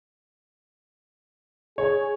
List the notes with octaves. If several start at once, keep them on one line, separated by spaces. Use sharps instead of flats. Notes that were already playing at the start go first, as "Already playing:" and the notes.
G#4 C#5